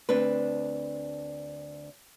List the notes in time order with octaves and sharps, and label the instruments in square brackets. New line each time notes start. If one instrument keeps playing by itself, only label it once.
[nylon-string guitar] D2 C4 D4 B4